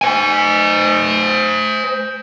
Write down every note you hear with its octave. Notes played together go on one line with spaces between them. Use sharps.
C5 G#5